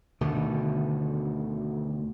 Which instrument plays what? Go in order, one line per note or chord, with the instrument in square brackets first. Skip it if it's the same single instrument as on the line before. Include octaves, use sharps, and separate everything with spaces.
[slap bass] D2 B2 D3 D#3